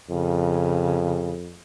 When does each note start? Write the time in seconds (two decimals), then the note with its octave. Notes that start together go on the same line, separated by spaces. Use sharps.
0.10 F2 C#3